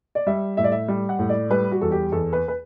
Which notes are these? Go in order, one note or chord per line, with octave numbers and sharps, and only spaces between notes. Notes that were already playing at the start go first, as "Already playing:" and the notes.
D5
G3 E5
A2 E5
D5
E5
G3
F#5
A2
D5
G3 B4
F#4
E2 A4
G4
E2 A4
B4
B4